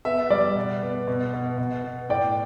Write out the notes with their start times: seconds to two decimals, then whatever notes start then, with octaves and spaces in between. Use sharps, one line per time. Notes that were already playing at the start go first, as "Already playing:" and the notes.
0.05 B3 E5
0.30 G3 D5
0.56 B2
0.82 B3
1.07 B2
1.33 B2
1.58 B2
1.84 B3
2.09 A2 D5 G5